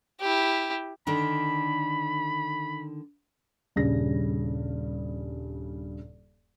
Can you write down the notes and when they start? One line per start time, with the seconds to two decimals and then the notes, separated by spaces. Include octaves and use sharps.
0.20 E4 G4
1.07 D3 D#3 D4 B5
3.76 D#1 G2 C#3 A#6